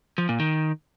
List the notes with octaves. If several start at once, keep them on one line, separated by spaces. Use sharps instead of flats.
F3
A#2
D#3